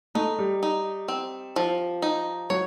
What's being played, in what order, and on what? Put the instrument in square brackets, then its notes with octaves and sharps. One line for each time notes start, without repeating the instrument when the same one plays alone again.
[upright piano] A3 [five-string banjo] D#4
[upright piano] G3
[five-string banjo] D#4
C4
F3
D#4
[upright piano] F#3 [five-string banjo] C#5